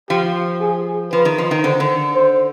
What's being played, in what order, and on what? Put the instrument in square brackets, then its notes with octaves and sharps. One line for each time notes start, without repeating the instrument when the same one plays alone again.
[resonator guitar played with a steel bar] F3 [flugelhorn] G4
[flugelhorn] G#4
[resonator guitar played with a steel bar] F3 [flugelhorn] B4
[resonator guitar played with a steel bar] D#3
F3
D#3
[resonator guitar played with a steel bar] D3 [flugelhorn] C5
[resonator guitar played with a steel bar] D3
[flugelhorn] C5